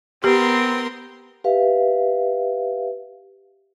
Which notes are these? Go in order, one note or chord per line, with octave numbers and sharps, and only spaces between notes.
B3 C4 G4 A#4 C6
G4 B4 E5 F5